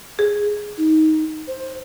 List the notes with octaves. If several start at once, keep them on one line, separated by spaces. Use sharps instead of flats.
G#4
D#4
C5